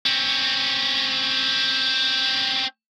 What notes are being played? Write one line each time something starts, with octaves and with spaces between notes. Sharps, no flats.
C4 C#4